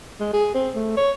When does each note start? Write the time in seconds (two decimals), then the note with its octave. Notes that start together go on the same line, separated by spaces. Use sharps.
0.20 G#3
0.33 G#4
0.54 C4
0.75 A3
0.97 C#5